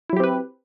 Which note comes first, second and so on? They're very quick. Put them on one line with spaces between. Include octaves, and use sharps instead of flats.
E4 F#3 G4 C4 B4